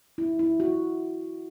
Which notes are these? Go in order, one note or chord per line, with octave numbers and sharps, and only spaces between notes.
E4
E4
F#4